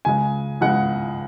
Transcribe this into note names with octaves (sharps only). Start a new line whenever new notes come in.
C#2 C#3 G#3 G#5
C#2 C#3 G#3 F#5